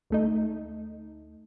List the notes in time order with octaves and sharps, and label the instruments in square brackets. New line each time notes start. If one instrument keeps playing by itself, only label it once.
[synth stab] D2 A3 D#4